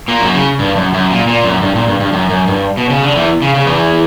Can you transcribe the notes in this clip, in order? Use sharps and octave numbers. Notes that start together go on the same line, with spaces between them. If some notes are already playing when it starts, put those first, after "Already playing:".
A#2 A#3
F#2 F#3
C#3
G2
F#2
F#2
A#2
A#2
F#2
G2
A#2
G2
G2
F#2
F#2
G2
B2
C#3
D3
E2 E3
C#3
C#3
E2 E3